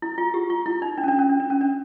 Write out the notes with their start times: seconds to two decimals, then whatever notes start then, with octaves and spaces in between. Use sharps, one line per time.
0.02 E4
0.18 F4
0.34 G4
0.50 F4
0.66 E4
0.82 D#4
0.98 D4
1.03 C#4
1.08 D4
1.19 C#4
1.29 D4
1.40 D4
1.50 C#4
1.61 D4